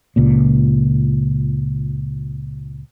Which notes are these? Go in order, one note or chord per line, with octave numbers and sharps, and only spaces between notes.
C#2 A#2